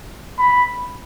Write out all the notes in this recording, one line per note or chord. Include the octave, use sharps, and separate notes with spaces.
B5